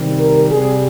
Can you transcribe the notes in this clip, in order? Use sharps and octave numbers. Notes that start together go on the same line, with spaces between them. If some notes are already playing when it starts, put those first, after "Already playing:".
Already playing: C3 D#3 G3
A#4
C3 G3 G#4